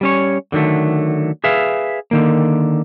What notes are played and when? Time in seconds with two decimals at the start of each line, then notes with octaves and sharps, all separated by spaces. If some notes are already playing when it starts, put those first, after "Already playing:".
0.01 G3 C#4 C#5
0.52 D3 D#3 F#3 A3
1.44 G#4 B4 E5 F5
2.11 D3 D#3 A#3